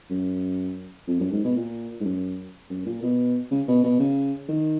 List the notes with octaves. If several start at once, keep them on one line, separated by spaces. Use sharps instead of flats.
F#2
F2
F#2
G#2
B2
A#2
G#2
F#2
F#2
A#2
B2
C#3
B2
B2
C#3
D#3